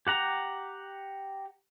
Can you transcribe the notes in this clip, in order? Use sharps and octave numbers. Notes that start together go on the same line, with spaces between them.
G4 F#5 A#5